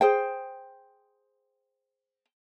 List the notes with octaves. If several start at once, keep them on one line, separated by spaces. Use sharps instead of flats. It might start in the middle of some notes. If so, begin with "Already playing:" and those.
G#4 C5 G5